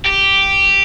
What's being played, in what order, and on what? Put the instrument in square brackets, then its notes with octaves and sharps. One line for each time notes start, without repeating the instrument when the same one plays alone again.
[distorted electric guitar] G4